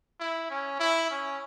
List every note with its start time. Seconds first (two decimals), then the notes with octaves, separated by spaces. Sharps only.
0.20 E4
0.50 C#4
0.79 E4
1.10 C#4